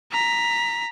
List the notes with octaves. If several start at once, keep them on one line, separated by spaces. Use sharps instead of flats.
A#5 B6